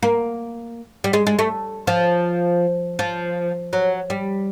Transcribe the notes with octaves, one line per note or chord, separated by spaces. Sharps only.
A#3
G3
G#3
G#3
A3
F3
F3
F#3
G3